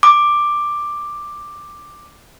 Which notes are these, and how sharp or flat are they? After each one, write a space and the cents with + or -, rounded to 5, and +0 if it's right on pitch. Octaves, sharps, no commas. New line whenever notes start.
D6 +5